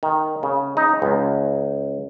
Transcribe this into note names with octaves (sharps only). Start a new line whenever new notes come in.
D#3
C#3
D#4
C#2